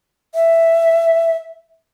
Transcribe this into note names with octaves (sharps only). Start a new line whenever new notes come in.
E5